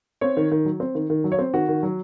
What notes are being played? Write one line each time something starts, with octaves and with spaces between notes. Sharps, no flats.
C4 C#5
D#3
D#3
F#3
C4
D#3
D#3
F#3
C#5
C4
D#3 F#4
D#3
F#3